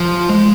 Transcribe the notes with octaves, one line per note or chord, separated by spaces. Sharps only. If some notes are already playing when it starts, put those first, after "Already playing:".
Already playing: F3
G#3